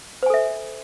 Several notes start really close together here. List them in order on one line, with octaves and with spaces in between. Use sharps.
C5 G#5 A4 E5